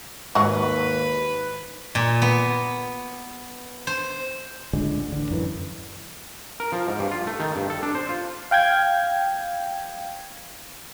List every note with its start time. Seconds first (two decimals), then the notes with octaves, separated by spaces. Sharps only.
0.35 D#2 G#2 F#3 F#4 B4
1.95 A#2
2.22 B3
3.87 C5
4.73 C#2 A2 D3 G#3
5.12 A1 D3
5.31 F#2 E3
6.60 A#4
6.72 F3
6.88 G#2
6.99 G2
7.11 F4
7.27 A3
7.40 D#3
7.56 G2
7.70 A4
7.83 D4
7.95 C5
8.09 F4
8.51 F5 G5 G6 G#6